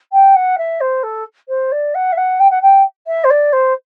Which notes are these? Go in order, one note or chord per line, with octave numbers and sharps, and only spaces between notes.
G5
F#5
E5
C5
A4
C5
D5
F#5
E5
F#5
G5
F#5
G5
E5
C5
D5
C5